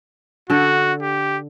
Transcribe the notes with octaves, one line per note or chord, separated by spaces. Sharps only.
D3 F#4 A4
G4